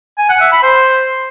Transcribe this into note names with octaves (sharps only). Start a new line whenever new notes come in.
G#5
F#5
E5
B5
C5